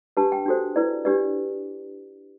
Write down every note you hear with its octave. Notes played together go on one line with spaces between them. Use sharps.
D4 G4 B4 A5
G5
D4 F#4 A4 C5
E4 B4 D5
D4 G4 B4 D5